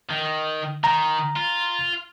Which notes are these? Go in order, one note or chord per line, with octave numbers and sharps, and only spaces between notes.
D#3
D#3 A#5
F4